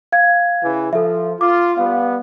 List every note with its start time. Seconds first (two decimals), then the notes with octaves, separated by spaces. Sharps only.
0.12 F5 G#6
0.63 C#3 E3
0.93 F3 A4 E5
1.41 F4 D6
1.77 G3 B3 F5